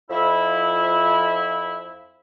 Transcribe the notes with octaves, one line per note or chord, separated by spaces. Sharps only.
F2 F3 E4